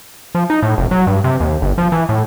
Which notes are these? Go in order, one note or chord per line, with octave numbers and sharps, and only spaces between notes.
F3
D#4
A2
F1
F#3
G2
C3
D#2
G1
F3
E3
A2